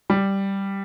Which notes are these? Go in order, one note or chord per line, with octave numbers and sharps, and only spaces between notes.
G3